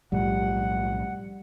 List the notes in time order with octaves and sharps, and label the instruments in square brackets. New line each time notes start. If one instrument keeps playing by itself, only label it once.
[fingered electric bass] B1 A2 F3 [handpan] G3 [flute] F#5